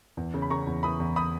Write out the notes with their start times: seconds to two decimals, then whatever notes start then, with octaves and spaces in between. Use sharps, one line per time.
0.17 E2
0.34 C#3
0.42 B5
0.50 C#3 A#5 C#6
0.67 E2
0.83 E3 B5 D#6
1.00 E2
1.16 B5 D#6